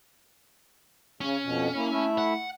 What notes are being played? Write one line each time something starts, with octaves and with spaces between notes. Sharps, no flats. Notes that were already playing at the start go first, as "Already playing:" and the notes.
C#3 C#4
F2 B2
A#3 E4
A3 E4 E5
F#5